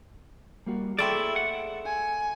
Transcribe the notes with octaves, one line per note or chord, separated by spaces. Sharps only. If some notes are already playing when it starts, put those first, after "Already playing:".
G3 A#3 F#4
A3 C4 E4 G#4 D5 E5 G5
F#5
G#5